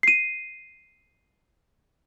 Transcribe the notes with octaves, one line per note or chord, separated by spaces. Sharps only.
C7 D#7